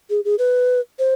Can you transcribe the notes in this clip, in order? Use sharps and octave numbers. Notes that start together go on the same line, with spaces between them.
G#4
G#4
B4
C5